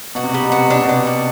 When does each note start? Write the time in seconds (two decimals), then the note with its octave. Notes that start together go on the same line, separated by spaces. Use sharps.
0.15 B2 F#4
0.24 C3
0.33 B2 G3
0.42 C3
0.50 B2 F#4
0.58 C3
0.68 B2 D4
0.76 C3
0.85 B2 D4
1.07 F#4